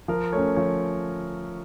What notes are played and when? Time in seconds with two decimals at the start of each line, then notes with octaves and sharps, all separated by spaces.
0.08 F3 A#4
0.33 A3 C#4 C#5
0.56 F3 C#5